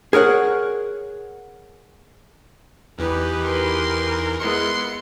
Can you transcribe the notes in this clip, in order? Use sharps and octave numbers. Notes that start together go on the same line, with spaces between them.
G#4 A#4 C#5 F#5
E2 E3 D#4 G4 B4
A#4 C6
G#3 B3 E4 C6 C#7